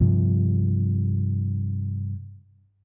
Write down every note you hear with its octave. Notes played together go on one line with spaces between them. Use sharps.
G2 C3 F3